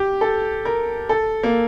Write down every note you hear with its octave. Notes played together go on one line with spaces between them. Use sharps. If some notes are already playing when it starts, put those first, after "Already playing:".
Already playing: G4
A4
A#4
A4
A#3